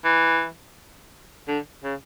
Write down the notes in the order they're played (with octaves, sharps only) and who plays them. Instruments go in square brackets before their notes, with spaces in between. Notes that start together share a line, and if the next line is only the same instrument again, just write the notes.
[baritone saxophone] E3
D3
C#3